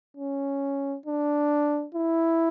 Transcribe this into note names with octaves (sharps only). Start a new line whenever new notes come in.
C#4
D4
E4